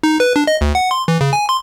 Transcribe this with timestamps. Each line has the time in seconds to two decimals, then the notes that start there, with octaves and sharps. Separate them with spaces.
0.03 D#4
0.20 B4
0.36 D4
0.47 D#5
0.61 D2
0.75 F#5
0.91 C6
1.08 E3
1.21 C#3
1.33 G#5
1.49 C6